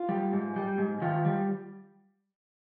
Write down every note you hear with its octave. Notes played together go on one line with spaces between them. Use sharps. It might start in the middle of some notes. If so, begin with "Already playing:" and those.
Already playing: F4
G3
G#2
G3
G#2
D#3 F4
G3